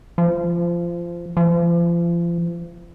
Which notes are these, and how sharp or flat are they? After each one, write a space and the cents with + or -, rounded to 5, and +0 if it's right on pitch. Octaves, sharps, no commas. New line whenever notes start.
F3 -20
F3 -35